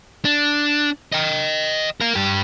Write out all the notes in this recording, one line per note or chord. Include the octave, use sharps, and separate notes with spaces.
D4
D#5 G5
A#4 F5
G2 G4